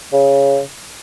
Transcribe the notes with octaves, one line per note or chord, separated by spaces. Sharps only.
C#3